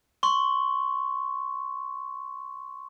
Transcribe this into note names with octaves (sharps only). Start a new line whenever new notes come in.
C6 C#6